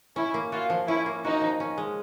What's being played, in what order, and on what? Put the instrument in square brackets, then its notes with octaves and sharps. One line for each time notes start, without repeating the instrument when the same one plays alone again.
[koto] C#4 [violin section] E4
[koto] A#3
[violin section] F4 [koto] F#4
[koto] F3
[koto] C#4 [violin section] E4
[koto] A#3
[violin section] D#4 [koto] F#4
[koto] F3
C#4
G#3